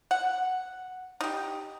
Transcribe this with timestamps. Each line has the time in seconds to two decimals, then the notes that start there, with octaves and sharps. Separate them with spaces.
0.11 F#5
1.21 D#4 G4